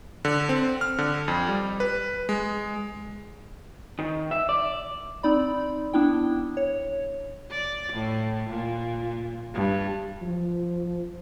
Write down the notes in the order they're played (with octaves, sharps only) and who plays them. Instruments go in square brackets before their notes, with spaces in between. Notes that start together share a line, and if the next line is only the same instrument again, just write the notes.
[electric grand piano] D3
C4
F6
D3
F2
G3
B4
G#3
[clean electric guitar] D#3
E5
D5
[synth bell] C4 D#4 D5 B5
B3 D4 E4 G5
C#5
[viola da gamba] D5
A2
A#2
G2
[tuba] F3